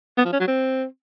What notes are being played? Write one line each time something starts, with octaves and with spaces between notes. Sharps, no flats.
B3
F3
C#4
F#3
C4